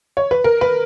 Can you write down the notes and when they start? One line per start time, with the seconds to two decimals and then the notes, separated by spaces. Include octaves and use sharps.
0.17 C#5
0.31 B4
0.44 A#4
0.61 B4